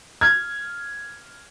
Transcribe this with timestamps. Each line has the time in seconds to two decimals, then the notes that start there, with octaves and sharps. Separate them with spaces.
0.21 F6 G#6